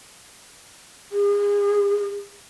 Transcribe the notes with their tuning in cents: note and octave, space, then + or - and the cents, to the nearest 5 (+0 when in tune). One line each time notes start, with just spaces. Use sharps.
G#4 -35